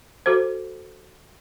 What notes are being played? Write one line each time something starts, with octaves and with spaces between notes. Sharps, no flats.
F#4 A4 C5